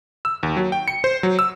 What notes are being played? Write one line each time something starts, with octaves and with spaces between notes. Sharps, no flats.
E6
D#2
F#3
G5
C#7
C5
F#3
E6